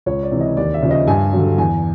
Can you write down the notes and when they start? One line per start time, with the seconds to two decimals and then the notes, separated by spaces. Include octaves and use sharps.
0.06 C#2 C#5
0.23 D5
0.31 C3 E3
0.40 D#5
0.57 D#2 D5
0.74 E5
0.82 C#3 F3
0.91 D#5
1.07 G2 G#5
1.32 D3 F#3
1.58 E2 G#5